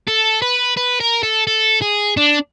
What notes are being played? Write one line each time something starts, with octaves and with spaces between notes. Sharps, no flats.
A4
B4
B4
A#4
A4
A4
G#4
D4